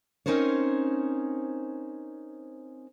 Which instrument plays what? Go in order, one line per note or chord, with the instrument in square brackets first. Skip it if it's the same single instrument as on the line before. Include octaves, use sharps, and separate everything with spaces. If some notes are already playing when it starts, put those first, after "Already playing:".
[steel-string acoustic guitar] C4 C#4 D#4 A#4 C5 C#5